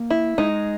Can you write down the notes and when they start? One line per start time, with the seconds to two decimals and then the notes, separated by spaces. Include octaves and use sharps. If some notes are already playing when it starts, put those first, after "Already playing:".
Already playing: A#3
0.10 E4
0.38 G#3 D#4